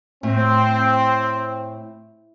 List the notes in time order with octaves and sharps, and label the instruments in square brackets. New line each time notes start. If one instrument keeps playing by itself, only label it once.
[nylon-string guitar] A2 [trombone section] C4